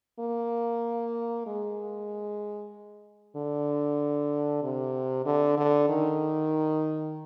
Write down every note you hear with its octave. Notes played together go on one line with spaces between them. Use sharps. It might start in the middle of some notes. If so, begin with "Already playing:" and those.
A#3
G#3
D3
C3
D3
D3
D#3